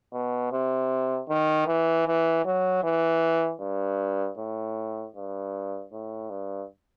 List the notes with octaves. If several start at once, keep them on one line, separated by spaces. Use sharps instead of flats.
B2
C3
D#3
E3
E3
F#3
E3
G2
A2
G2
A2
G2